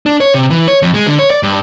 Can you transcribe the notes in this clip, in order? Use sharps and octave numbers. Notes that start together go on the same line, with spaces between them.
D4
C#5
C3
E3
C#5
F2
G#3
D3
C#5
D5
G2